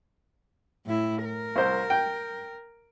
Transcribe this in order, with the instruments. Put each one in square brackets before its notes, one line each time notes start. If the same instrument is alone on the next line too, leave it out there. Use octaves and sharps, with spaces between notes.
[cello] A2 E4
A#4
[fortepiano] C2 C5
G5